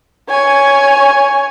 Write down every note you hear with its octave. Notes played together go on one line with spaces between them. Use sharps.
C#5 G#5